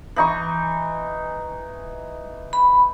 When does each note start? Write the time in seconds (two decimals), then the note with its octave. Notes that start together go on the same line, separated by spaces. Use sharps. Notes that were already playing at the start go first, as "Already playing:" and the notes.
0.16 E3 D#4 C#6
2.53 B5